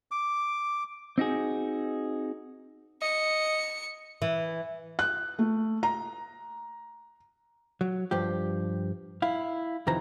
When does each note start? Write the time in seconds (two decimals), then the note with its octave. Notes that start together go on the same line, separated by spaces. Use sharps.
0.11 D6
1.18 C4 D#4 F#4 G#4
3.02 D#5 C#7
4.22 E3
4.99 F#6
5.39 A3
5.83 A#5
7.81 F#3
8.11 G2 F3 G4
9.22 E4 F5
9.87 F2 C3 D#3 E3 A#5